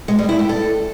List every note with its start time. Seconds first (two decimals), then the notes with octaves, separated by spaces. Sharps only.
0.08 G#3
0.18 G3
0.29 E4
0.39 G4
0.49 A4